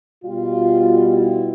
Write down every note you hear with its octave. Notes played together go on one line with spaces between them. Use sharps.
B2 G3 B3 F4
E4